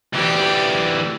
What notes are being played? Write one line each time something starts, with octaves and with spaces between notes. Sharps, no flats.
D2 E3 G4 D5